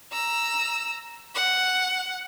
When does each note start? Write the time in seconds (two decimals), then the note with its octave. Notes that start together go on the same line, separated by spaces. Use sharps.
0.12 A#5 E6
1.35 F#5